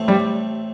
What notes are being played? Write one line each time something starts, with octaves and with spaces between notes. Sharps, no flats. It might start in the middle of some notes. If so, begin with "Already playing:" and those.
Already playing: A1 A2 A3 C4
G3